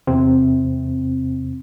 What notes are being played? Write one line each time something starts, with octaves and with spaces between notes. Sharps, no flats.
E2 C3 C4